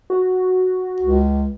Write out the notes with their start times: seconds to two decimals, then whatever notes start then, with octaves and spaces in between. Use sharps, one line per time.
0.10 F#4
1.00 C#2